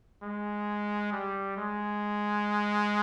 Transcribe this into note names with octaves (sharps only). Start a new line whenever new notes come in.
G#3
G3
G#3